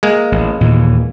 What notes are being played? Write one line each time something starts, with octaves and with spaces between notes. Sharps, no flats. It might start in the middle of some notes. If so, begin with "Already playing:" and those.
G#3 A#3
A1
D#2 A#2 E3